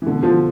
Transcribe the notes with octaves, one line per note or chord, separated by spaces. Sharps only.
E3
B2 D3
D3 F3